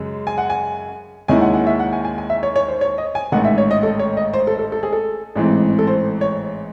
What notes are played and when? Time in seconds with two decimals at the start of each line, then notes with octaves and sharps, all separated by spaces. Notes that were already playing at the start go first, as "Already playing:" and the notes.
Already playing: F#2 C#3 G#3
0.27 G#5
0.38 F#5
0.50 G#5
1.28 D#2 D#3 G#3 C#4 E4 G#5
1.41 F#5
1.54 F#5
1.67 E5
1.79 F#5
1.93 G#5
2.05 G#5
2.18 G#5
2.30 E5
2.43 C#5
2.56 C#5
2.68 C5
2.81 C#5
2.98 D#5
3.15 G#5
3.32 A1 G#2 D#3 F#5
3.45 E5
3.58 C#5
3.71 D#5
3.83 A4
3.99 C#5
4.17 D#5
4.34 C5
4.47 A4
4.59 A4
4.72 A4
4.83 G#4
4.93 A4
5.35 A1 G#2 E3 C4
5.79 A4
5.87 C5
6.21 C#5